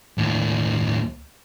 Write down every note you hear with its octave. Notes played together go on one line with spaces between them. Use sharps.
D#2 A2